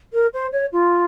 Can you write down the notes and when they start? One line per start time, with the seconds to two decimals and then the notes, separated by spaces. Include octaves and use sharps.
0.13 A#4
0.33 C5
0.52 C#5
0.72 F4